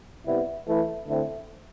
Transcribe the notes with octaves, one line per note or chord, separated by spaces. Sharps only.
C3 G3 B3 E4
E3 A3 E4
D3 A3 C4 E4